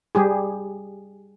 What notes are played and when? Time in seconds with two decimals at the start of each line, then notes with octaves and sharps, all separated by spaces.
0.15 G3 G4 G#4